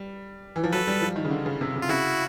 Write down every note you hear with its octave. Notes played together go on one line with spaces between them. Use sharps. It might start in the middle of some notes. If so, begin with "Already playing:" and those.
Already playing: G3
E3
F3
F#3 A4 B4
G3
F3
D#3
C#3
D3
C#3
C3
C#3
F4
C#3 E4 F#4